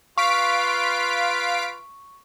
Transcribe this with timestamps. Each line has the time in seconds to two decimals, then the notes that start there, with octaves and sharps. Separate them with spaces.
0.18 F4 B4 F5 C6 C#6 B6 D7